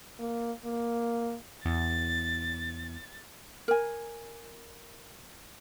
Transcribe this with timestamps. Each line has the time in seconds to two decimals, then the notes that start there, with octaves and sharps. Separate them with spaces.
0.20 A#3
0.65 A#3
1.65 E2 A6
3.68 A#4 G#5